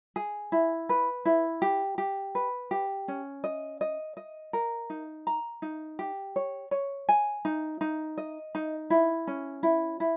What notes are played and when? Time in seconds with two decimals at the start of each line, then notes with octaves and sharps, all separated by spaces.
0.16 G#4
0.52 E4
0.89 B4
1.25 E4
1.62 G4
1.98 G4
2.35 B4
2.71 G4
3.08 C#4
3.44 D#5
3.81 D#5
4.17 D#5
4.53 A#4
4.90 D#4
5.27 A#5
5.62 D#4
5.99 G4
6.36 C#5
6.71 C#5
7.09 G#5
7.45 D#4
7.81 D#4
8.18 D#5
8.55 D#4
8.90 E4
9.27 C#4
9.63 E4
10.00 E4